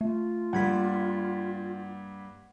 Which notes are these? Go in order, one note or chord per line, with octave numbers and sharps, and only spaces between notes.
A3 F4
G2 G3 A#3 F#5 G#6 B6